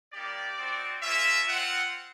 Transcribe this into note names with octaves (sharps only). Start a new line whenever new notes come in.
G3 A#3 D#4 G4 D5
C4 D#4 F#4
A#3 C#4 F4 E5
C4 F4 F#5